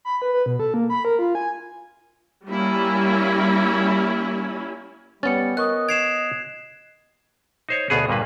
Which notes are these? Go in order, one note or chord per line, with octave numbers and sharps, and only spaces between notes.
B5
B4
B4
B2
A4
A#3
B5
A#4
F4
G#5
G3 A#3 C#4 E4
G3 B3 C#4 A6 C#7
A#4 D#5 C#6 D#6 F#6
G#6 C7 D7 E7 F7
D#4 C5 C#5
D2 B2 B3 G#4
G2 A#2 A#3 B4